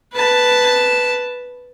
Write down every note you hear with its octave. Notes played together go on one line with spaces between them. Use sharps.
B4 A5